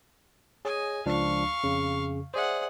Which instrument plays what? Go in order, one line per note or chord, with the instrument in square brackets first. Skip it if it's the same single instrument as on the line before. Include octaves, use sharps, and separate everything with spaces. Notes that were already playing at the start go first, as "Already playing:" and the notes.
[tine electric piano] G#4 C#5 [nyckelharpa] D#5 G#5
[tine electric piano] C#2 F3 D4 [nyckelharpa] F5 C#6
[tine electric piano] F2 C#3
[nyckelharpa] G#4 F#5 [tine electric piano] C5 D5 E5